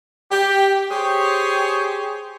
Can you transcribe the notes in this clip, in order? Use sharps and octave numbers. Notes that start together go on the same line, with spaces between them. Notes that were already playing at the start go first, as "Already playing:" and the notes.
G4
G4 G#4 C5 C#5